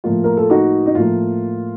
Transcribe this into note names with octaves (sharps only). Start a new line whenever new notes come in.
A2 F3 A#3 F4
A#4
A4
D#4 F#4
D#4
A2 F3 A#3 F4